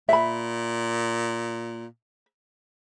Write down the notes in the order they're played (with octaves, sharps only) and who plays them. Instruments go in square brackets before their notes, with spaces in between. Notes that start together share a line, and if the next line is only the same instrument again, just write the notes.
[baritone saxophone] A#2 [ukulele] E5 B5